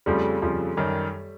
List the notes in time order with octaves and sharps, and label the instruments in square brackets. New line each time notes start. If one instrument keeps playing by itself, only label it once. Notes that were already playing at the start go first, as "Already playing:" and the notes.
[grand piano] F2 C#3 F3 [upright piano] G3 A3
[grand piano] F2 C#3 F3
F#2 D#3 G3